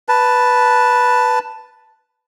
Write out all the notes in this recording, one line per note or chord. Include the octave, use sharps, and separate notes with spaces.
B4 A5